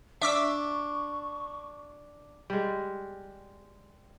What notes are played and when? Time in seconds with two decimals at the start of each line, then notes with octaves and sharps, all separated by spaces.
0.22 D4 E5 C#6 D6 E6
2.50 G3 G#3